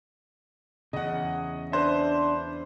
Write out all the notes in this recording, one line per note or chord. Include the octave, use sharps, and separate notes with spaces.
E2 C#3 D#5 F#5
D4 B4 C5 E5